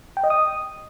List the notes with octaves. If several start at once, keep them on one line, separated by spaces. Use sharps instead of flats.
G5
D#5
D#6